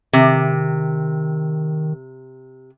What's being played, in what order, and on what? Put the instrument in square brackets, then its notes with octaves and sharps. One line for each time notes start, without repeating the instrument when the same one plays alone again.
[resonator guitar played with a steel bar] C3 [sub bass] D#3